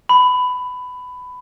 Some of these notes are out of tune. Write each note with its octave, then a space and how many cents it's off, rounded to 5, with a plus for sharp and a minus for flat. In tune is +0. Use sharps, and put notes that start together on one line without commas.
B5 +15